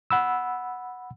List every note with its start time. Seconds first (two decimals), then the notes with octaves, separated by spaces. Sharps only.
0.11 F#5 B5 E6